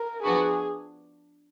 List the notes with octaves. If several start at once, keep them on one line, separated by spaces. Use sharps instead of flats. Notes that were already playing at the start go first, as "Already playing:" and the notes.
Already playing: A#4
F3 B3 D4 F#4 G#4 B4